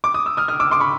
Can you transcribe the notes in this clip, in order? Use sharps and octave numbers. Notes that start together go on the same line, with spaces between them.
D6
D#6
E6
D#6 F6
D#6 F6
D6 E6
C6 D6
B5 C#6